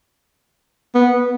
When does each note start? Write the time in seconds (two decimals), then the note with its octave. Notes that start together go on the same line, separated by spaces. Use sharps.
0.95 B3